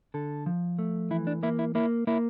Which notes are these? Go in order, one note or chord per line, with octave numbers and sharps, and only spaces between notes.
D3 A4
F3
A3
E3 E4
D4
A#3 E4
E4
A#3 E4
A#3 E4